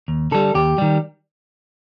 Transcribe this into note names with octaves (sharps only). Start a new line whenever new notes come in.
D#2
D3 G3 A4
D#2 G4
D#3 G3